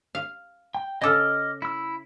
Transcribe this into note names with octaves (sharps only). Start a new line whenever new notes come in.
F5
G5
C#3 A4 D#5 D6 F6
E4 E6